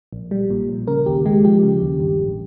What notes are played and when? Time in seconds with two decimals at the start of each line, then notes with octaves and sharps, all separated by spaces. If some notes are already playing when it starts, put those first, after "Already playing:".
0.13 A#1
0.31 G3
0.50 A#2
0.69 A#1
0.87 C#3 A#4
1.06 D#2 G4
1.26 G#3 G4
1.44 F3 G4
1.63 C#3
1.82 D#2
2.00 G2
2.19 A1